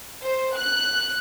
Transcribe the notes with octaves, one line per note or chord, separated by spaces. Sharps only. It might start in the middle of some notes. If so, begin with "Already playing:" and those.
C5
F#6